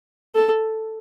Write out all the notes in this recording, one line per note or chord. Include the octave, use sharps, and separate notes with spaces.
A4